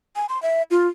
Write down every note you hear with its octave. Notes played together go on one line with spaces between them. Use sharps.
G#5
C6
E5
F4